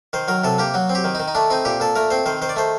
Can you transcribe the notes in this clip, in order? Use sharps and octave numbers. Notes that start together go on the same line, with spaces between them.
D#3 C5
F#3 A#4
C3 A4
A#3 G4
F#3 F#4
C4
G4
D#3
D#4
D#3
D#4
A3 D4
C4 D#4
A#2 G4
A#2 A4
A3 A#4
C4 C5
D#3 C5
D#3 C5
D5
A3 C5